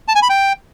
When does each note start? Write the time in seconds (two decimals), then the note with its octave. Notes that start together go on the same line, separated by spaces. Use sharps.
0.08 A5
0.15 G#5
0.22 B5
0.29 G5